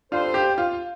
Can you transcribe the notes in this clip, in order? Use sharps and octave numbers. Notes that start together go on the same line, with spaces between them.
G3 D4 F4 A4 C5
G4
F4